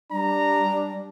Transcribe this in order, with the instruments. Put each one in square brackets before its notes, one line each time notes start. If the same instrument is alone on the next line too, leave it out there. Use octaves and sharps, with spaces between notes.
[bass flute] G3 [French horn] D4 [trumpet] A#5